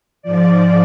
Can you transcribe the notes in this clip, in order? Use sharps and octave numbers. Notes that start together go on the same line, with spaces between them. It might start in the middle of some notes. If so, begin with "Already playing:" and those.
G#2 F3 D5